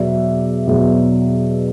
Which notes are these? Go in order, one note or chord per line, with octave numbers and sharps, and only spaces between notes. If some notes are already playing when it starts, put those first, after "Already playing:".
Already playing: E2 B2 F#3 D5 E5
E2 B2 F#3